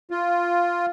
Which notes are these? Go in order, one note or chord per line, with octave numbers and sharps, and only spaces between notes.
F4